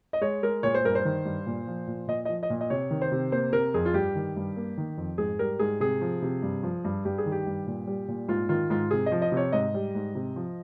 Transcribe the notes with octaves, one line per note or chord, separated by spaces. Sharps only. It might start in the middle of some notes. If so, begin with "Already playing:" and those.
D#5
G#3 C#5
G#3 A#4
A#2 C#5
C5
G2 A#4
C5
D#3
G2
A#2
F3
A#2
A#2 D#5
F3 D#5
D#5
A#2
D#5
C3 C#5
D#3
C5
C3
A#3 C5
C3 A#4
F2 G#4
F4
G2 G4
D#3
G2
A#3
D#3
F2
G#2 G#4
G3 A#4
G#2 G#4
C3 G#4
F3
C3
G2
F3
G2
G2 G4
G#4
D#3
G4
G2
A#2
G3
A#2
G#2 F4
D#3 F4
G#2 F4
C3 G#4
D#5
F3
D#5
C3 C#5
G#2 D#5
G3
G#2
C3
F3